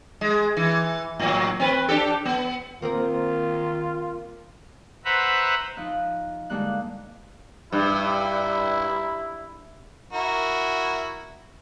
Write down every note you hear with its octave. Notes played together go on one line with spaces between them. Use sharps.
G#3
E3
A2 F#3
C4 B4
D4 G4 A4
B3
D#3 A#3 C4 F4 A#4
B4 C5 E5 F#5 A#5 B5
F3 D#4 F#6
D3 G3 G#3 A#3 F#6
G2 E4
E4 F#4 A#4